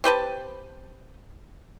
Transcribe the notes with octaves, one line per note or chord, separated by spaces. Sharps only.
C4 G4 B4 A5